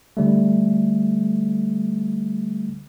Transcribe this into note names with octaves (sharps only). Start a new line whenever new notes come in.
D3 G3 A3